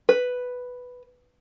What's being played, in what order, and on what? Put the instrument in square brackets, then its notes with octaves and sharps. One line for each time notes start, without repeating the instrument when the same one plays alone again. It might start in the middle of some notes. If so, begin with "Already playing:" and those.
[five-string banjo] B4